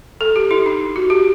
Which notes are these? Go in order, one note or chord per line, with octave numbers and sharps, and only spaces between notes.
A4
G4
E4
D#4
F#4
G4